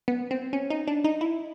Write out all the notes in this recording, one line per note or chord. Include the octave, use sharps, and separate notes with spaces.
B3
C4
C#4
D#4
D4
D#4
E4